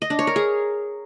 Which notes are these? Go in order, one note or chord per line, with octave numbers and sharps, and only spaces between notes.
D#5
D4
C#5
A#4
G#4